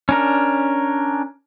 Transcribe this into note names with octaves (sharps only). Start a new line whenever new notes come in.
C#4 D4 A#4